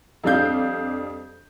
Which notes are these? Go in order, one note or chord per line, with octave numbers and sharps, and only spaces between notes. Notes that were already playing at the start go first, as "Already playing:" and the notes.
F2 G3 D4 F5 G6